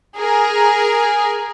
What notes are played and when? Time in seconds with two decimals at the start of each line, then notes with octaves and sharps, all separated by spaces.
0.17 G#4 A#4